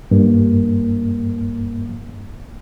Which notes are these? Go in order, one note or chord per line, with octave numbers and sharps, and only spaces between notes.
G2 A#3